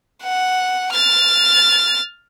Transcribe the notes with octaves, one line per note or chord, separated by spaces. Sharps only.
F#5
F6 A6